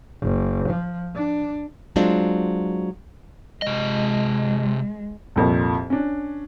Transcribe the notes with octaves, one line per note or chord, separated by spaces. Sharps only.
F#1
F3
D4
F#3 G#3 C4 D4 F4
C3 G#3 D#5
C2 F2 A#2
C#4 D4